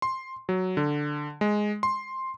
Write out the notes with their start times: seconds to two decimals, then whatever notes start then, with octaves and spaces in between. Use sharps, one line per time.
0.02 C6
0.49 F#3
0.77 D3
1.41 G#3
1.83 C6